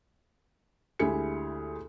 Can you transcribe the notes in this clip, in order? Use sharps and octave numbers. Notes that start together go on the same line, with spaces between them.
D2 G#3 E4 G4 G#4 C#7